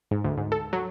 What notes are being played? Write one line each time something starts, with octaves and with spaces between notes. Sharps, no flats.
G#2
D2
G#2
A4
F#3